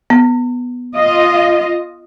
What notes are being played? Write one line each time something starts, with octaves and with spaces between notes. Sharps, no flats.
B3
F4 D#5